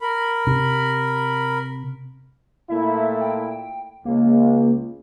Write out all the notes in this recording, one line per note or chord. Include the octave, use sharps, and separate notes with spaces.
A#4 B5
C3
A#2 A3 E4 E5
G5
C#2 A#3